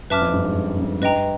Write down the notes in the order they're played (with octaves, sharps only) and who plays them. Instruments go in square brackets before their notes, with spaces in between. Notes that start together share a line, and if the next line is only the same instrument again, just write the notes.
[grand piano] F#2 [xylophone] B4 E5 A5 D6 F6
[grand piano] F2
G2
G#2
G#2
G2
[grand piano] G2 [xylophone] B4 D#5 G5 A#5